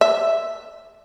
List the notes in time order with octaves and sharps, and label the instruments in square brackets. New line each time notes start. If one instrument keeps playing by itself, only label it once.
[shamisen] E5